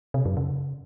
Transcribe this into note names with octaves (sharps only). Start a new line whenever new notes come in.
C3
F#2
C#3